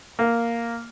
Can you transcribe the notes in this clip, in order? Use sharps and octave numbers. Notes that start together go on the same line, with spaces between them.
A#3